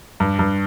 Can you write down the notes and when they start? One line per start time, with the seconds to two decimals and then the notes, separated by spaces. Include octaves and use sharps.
0.20 G2
0.39 G2